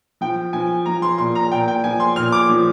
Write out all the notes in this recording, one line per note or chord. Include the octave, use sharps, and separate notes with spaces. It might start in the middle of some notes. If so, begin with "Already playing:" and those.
F3 G5
F3 G#5
F3 A#5
C6
A#2 C6
A#5
A#2 G5
G5
F3 G#5
C6
A#2 F6
D6
F3